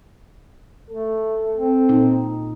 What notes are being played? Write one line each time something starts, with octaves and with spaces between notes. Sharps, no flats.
A3 A4
C4
A#2 D#4